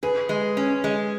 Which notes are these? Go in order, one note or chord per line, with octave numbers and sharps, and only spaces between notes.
G#4 B4
G#3
C#4
G#3